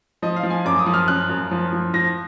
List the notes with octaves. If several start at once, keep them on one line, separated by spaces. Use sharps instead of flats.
F3 D#5
F5
F3
G#5
F#2 D6
D#6
F3
F6
F#2 F#6
F#2
F3
F3
F3 A#6